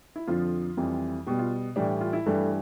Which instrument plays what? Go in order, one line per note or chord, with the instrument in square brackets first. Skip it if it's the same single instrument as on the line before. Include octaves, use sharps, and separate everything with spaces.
[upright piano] E4
F2 D3 F3 F4
F2 E3 G3
B2 G3 G4
F4
A2 E3 G3 D4
F4
E4
G2 E3 G3 A3